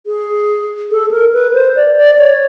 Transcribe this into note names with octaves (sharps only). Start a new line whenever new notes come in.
G#4
A4
A#4
B4
C5
D5
D5
C#5